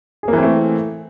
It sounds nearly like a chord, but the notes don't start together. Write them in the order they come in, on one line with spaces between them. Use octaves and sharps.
G#4 A#3 E3 C4 A3